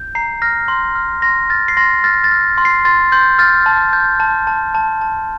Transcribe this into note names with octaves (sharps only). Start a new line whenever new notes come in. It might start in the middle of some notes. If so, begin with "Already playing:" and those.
Already playing: G6
A#5 C7
F6 A#6
C6
F6
C6 A#6
F6 A6
C7
C6 A#6
F6 A6
A6
F6
C6
C7
C6 A6
C6 G6
F6 A6
A5
G6
A5
A5
A5
A5